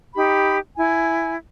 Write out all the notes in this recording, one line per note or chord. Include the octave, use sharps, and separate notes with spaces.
D#4 G4 B5
E4 G#5